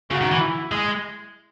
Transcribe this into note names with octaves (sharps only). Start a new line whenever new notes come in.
C#3 F#4
D#3
E3
E4
G#3